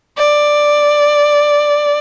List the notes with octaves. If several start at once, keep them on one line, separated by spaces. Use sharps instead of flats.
D5